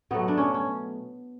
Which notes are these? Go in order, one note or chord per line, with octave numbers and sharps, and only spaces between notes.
B2 F#3 A3 B3
D4
C#4
C#4